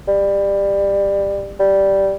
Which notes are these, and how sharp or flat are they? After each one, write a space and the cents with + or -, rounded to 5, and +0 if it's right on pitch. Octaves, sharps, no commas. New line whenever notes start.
G3 +20
G3 -5